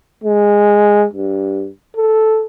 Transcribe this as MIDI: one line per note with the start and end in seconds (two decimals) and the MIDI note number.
0.24 1.06 56
1.13 1.68 43
1.96 2.46 69